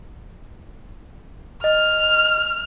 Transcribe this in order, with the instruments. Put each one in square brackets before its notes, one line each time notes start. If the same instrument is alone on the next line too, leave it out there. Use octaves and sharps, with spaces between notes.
[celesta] D#5 [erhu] F6